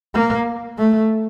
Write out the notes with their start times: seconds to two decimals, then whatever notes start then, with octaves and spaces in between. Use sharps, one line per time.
0.15 A#3
0.79 A3